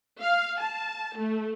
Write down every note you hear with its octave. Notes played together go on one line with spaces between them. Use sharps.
F5
A5
A3